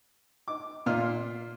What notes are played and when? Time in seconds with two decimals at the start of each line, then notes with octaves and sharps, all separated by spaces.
0.48 D6
0.86 A#2 F4 F6